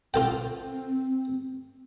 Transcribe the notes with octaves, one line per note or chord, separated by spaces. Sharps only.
C4 F4 A4 G5